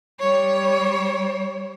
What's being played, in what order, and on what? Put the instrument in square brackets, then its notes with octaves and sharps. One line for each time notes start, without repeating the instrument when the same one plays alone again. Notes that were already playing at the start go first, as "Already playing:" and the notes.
[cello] G3 C#5